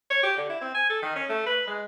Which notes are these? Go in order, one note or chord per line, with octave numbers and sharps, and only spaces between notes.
C#5
G4
D3
E4
C4
G#5
A4
D#3
C#4
A3
B4
G#3